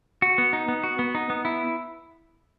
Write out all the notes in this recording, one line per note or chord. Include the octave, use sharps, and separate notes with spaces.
F#4
B3
D#4
B3
F#4
B3
D#4
B3
E4